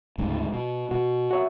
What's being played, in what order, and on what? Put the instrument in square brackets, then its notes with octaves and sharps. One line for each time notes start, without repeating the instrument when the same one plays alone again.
[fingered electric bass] D2 G#2 C#3
B2
[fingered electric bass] B2 [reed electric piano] F#4
[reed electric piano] F#4 C#5 E5